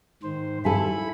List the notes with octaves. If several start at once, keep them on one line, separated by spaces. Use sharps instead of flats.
G#2 D#3 C5
E4 A4 G#5 B5